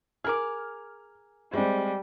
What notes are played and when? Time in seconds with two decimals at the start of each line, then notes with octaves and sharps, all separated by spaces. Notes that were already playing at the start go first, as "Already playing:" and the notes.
0.24 G#4 A#4 D6 F6
1.53 G3 G#3 C4